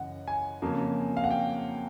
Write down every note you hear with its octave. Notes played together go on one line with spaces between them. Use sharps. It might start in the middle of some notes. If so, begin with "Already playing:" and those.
Already playing: F#2 C#3 E3 D#5 F#5
G#5
F2 C#3 F#3 A#3
F5
F#5
G5